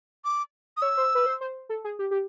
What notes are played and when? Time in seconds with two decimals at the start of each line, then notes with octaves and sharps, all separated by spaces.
0.25 D6
0.77 D#6
0.82 C#5 E6
0.97 C5
1.15 B4
1.26 C5
1.41 C5
1.69 A4
1.84 G#4
1.99 G4
2.11 G4